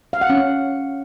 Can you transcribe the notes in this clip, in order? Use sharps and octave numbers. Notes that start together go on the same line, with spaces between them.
F5
F#5
C#4